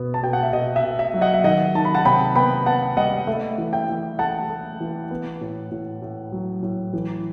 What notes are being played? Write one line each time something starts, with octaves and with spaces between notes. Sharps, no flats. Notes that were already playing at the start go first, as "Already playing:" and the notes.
Already playing: B2 B3
A5
B2 G5
F#5
E5
B2 D#5
E5
B2
E5
F#3
D#5 F#5
E5
D#3 D#5 F#5
D#3 A5
B5
F#5 A5
C3 G5 B5
B3 G5 B5
B3 F#5 A5
G3 D#5 F#5
A3 E5
E3
E5 G5
E3
A3 F#5 A5
A3
E3
B3
A2
A2
A2
F#3
A2
E3